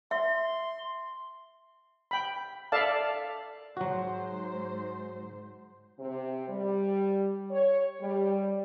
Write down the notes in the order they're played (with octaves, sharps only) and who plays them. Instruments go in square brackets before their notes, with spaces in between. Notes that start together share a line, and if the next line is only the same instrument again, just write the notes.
[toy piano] E5 [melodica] C6
[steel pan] G5 B5
A4 D5 E5 F5 A5
[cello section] G#2 C5 [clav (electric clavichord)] F#3 F#4
[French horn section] C3
G3
C#5
G3